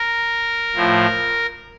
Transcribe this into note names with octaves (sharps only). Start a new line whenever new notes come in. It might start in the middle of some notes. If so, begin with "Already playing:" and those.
Already playing: A#4
A2 F3